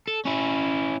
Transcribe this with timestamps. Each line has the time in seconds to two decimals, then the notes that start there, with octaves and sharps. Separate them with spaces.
0.08 A4
0.25 C#4 E4